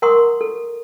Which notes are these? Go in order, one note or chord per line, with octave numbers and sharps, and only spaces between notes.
A#4 F#5 A#5 C6 C#6 D#6
A4